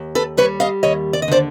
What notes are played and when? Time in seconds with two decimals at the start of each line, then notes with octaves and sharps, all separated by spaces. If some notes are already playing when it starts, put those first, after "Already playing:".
Already playing: D#2
0.15 A4 B4
0.37 G3 B4 C#5
0.60 D#5 F5
0.83 D#2 C#5 D#5
1.13 D5
1.22 D#5
1.28 D3 C5 D5